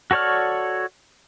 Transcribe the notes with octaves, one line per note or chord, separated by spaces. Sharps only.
F#4 A4 C#5 D5 F6